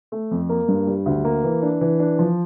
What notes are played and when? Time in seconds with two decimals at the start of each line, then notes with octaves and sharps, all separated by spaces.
0.12 A3
0.31 F2
0.49 A#3
0.68 G2
0.87 G3
1.06 D2
1.25 A#3
1.44 E3
1.62 D4
1.81 E3
1.99 D4
2.19 F3